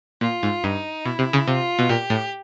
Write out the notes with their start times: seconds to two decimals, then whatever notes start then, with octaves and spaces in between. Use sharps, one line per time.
0.21 A#2 F4
0.43 G#2
0.64 G2 D#4
1.05 B2 E4
1.19 C3
1.33 C#3
1.47 C3 F4
1.79 B2
1.89 A#2 G4
2.10 A2